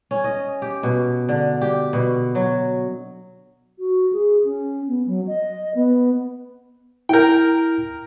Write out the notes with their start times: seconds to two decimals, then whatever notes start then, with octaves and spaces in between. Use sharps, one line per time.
0.11 C#4
0.24 D#5
0.62 G4
0.83 B2
1.29 D3
1.61 G4
1.93 B2
2.35 F#3
3.79 F#4
4.13 G#4
4.44 C#4
4.88 B3
5.06 F#3
5.27 D#5
5.75 B3
7.09 E4 A#4 G5 G6